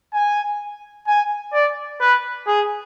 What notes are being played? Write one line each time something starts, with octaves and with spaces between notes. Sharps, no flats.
G#5
G#5
D5
B4
G#4